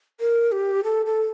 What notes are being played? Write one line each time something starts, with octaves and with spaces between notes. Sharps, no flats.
A#4
G4
A4
A4